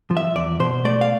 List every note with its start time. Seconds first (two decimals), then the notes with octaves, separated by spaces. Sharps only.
0.11 F3
0.17 E5
0.36 E2 D5
0.60 B2 C5
0.85 A3 D5
1.01 F5